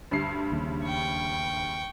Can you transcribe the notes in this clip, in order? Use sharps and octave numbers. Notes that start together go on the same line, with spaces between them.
D2 G2 C7
D#2 C#3
G5 C#6